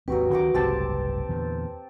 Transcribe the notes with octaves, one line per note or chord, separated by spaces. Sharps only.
G#1 D#2 F#3 C4 F#4 G4 B4
D2 D#3 C#4 A#4 F#5 D6
F#1 C2 G#2 C4 G4 A5
E2 A#2 D3